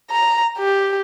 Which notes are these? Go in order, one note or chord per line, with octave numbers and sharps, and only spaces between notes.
A#5
G4